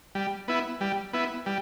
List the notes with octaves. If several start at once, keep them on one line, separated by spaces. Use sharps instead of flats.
G3
B3 E4
G3
B3 E4
G3